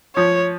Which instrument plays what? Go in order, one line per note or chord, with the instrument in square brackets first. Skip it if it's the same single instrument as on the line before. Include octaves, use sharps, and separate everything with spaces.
[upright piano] F3 [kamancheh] C#5